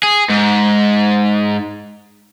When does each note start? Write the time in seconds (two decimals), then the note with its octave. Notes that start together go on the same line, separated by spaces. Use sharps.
0.03 G#4
0.29 G#2